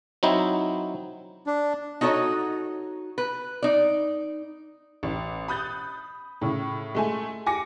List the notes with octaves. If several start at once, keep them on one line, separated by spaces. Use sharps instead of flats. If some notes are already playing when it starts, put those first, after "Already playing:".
F#3 C4 D#4 E4
D4
D#4 F#4 A4 C#5 D#5
B4
D#4 D5
A1
B5 D#6 F#6 G6 A6
A2 C#3
G#3 A3 G#5
G#5 D6 A#6 C#7